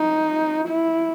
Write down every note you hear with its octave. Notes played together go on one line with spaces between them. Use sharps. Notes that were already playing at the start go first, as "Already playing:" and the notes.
Already playing: D#4
E4